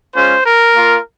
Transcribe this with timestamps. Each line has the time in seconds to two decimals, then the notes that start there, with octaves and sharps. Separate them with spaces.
0.15 G#3 C#4 F4 C5
0.45 A#4
0.75 A#3 F4